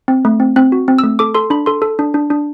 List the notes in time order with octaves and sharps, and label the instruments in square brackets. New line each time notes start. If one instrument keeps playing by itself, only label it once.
[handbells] C4
A3
C4
C4 F#6
F#4
C4
A3 E6
A4 D6
A4 C6
D4 B5
A4 C6
A4
D4
D4
D4